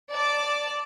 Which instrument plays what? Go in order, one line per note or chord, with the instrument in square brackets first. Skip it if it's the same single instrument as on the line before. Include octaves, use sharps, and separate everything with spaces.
[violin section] D5 A5 D6